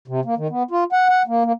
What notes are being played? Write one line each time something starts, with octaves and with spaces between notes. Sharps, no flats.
C3
A#3
D#3
B3
F4
F#5
F#5
A#3
A#3